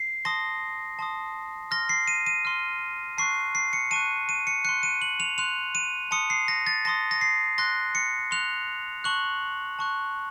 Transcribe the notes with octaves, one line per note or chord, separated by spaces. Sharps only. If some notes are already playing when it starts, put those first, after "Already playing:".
Already playing: C7
A5 C6 D#6 A#6
A5 C6 D#6
C6 F6 A#6
C7
D#7
D#7
C6 F6
A5 C#6 F#6 C7
C7
C#7
A5 C#6 F#6 D#7
D#7
C#7
C6 F#6 C#7
D#7
F#7
F7
C6 F#6 F7
D#7
A5 C6 D#6 C#7
C7
A#6
A6
A5 C6 D#6 A#6
A#6
C7
C6 F#6 A#6
C#7
C6 F#6 F7
A5 C#6 F#6 F#7
A5 C#6 F#6